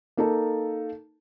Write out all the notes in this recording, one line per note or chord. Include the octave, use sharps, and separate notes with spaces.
A#3 D#4 A4 A#4 A5